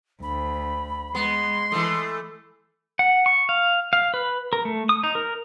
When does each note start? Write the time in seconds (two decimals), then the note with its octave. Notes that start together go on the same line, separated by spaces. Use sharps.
0.23 D2 B5
1.15 G#3 B3 C6
1.72 E3 A3 D#6
2.99 F#5
3.26 C#6
3.49 F5
3.93 F5
4.14 B4
4.53 A#4
4.65 A3
4.89 D#6
5.03 D#4
5.15 A#4